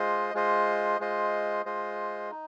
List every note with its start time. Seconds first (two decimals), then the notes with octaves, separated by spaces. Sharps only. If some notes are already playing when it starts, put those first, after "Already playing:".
Already playing: G#3 F4 C5 D#5
0.34 G#3 F4 C5 D#5
1.00 G#3 F4 C5 D#5
1.66 G#3 F4 C5 D#5
2.31 D#4